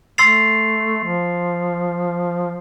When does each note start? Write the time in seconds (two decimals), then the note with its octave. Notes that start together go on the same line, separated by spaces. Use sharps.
0.18 A3 C6 E6 A6 C7 F7
1.03 F3